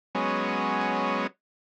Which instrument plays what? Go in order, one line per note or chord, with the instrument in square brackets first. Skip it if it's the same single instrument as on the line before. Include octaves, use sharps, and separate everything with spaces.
[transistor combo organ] F#3 G#3 B3 C#4